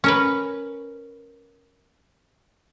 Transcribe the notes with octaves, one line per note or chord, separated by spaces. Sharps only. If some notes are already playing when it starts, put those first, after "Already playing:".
C#4 A#4 B4